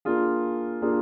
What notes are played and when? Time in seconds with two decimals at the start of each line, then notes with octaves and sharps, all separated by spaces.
0.05 A#3 D4 F4 G#4
0.82 A#3 D4 F4 G#4